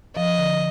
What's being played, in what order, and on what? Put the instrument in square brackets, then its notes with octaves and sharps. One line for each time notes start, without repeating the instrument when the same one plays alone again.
[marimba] F3 [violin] D#5
[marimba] D3